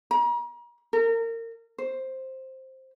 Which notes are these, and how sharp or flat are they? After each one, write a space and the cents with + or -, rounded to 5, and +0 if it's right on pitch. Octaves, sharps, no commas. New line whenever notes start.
A#5 +40
A#4 -30
C5 +5